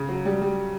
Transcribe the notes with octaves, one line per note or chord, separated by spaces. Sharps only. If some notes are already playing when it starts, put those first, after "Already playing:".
Already playing: C#3
F#3
G3
G3